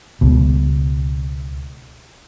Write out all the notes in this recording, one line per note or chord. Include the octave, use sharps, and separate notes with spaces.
C#2 B2